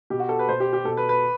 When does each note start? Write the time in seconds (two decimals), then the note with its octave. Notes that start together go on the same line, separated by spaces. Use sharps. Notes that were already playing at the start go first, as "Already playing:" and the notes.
0.10 B2 G4
0.20 F#4
0.29 A4
0.39 B4
0.48 B2 C5
0.60 G4
0.73 G4
0.85 B2 A4
0.97 B4
1.09 B4